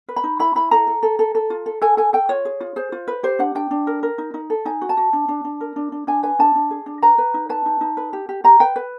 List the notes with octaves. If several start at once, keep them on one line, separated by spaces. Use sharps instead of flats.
B4
B5
D#4
E4 B5
E4 B5
A4 A#5
A4
A4
A4
A4
F4
A4
A4 G#5
A4 G#5
A4 G5
F4 C#5
G#4
F4
G#4 C5
F4
B4
G4 C5
D4 F#5
D4 G5
D4
A#4
A#4
D#4
D#4
A4
D#4 G#5
F#4
A5
F#4
D4
D4
D4
A#4
D4
D4
D4 G#5
B4 G#5
D4 A5
D4
G#4
D4
B4 A#5
B4
D#4
B4 A5
D#4
D#4
B4
G4
G4
G4 A#5
B4 G5
B4